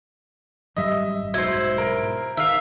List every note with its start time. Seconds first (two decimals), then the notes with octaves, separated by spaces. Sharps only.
0.77 G#1 F#2 G3 D#5 E5
1.34 B1 G#2 F#3 E4 C5
1.78 A#4 D7
2.37 D#3 E5 F5